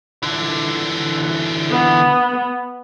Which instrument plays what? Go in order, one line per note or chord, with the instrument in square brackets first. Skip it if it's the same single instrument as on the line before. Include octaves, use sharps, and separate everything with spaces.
[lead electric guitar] D3 E3
[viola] B3